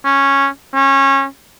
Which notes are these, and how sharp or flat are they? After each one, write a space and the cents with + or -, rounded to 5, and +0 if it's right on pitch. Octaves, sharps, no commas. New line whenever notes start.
C#4 -10
C#4 -25